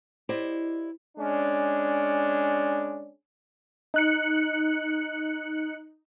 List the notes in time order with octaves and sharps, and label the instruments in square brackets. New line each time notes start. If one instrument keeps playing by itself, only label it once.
[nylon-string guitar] E4 G4 C5 D5 D#5
[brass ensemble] G#3 C#4 D4
[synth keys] D#4 F#6 C#7